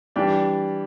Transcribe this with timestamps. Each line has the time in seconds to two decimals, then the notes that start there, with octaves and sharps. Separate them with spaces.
0.16 E3 G3 D4 G4